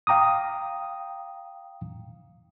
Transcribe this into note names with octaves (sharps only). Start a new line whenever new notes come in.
F5 G5 A#5 D6 D#6